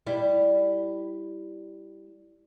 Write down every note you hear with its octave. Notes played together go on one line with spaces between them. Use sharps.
G3 E4